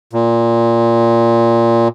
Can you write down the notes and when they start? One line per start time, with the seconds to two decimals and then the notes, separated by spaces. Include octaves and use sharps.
0.13 A#2